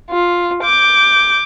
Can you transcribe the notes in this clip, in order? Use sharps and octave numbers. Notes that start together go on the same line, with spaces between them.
F4
D6 G6